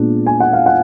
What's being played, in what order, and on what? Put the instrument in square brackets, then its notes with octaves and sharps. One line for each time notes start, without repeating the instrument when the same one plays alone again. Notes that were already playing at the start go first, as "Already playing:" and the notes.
Already playing: [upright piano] A#2 G#3 B3 D4
G#5
F#5
F5
F#5